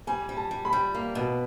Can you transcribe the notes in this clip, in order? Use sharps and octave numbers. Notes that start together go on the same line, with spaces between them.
G3 G#5
G3
A5
G3
B5
G3
A#3
B2